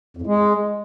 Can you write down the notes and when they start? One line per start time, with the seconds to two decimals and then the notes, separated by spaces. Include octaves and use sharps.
0.17 F2
0.22 A2
0.27 G#3